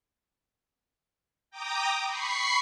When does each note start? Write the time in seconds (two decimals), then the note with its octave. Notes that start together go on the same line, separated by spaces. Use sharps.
1.50 G5 A#5 D6 D#6
2.05 B5 C#6 C7